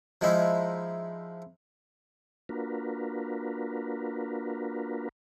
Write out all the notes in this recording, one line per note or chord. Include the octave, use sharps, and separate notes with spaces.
F3 G#3 D#4 E4
A#3 D4 F4 F#4 A#4 B4